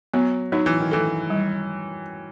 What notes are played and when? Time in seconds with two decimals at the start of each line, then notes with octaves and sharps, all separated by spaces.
0.14 F#3 B3
0.52 F#3 D#4
0.66 E3
0.80 D#3
0.91 E3 A4
1.30 G3